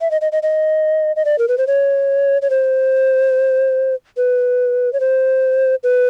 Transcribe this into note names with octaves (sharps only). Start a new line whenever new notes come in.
E5
D#5
D#5
D#5
D#5
D#5
D5
A#4
B4
C5
C#5
C#5
C5
B4
C#5
C5
B4